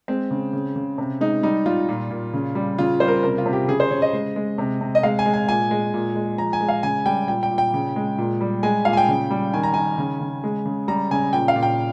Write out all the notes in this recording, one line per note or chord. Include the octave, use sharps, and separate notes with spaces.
G#3 C4
C#3
C#3
C#3
C3
G#3 D#4
G3 D#4
G3 F4
A#2
A#2
C#3
G3
C#3 F4
G3 C5
A#4
C3 A#4
F4
C3
G4
C#3 G#4
C5
C#3 C#5
D#5
G#3
G#3
C3
C3
D#5
G#3 F5
G#5
G#3
G#5
A#2 G#5
G#3
A#2
G#3
F3 A#5
G#5
G#3
F5
C#3 G#5
G3 G5
A#2 G5
G5
A#2
G5
C#3
G#3
A#2
G3
G#3 G#5
A#2 F5
G#5
G5
C#3
G3
D#3 G#5
A#5
D#3 G#5
C#3
C#3
G#3
C#3
G3 A#5
C#3 G#5
A#2 G5
F5
A#2
G5